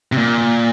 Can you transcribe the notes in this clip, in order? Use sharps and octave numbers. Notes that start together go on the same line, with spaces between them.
C3
A#2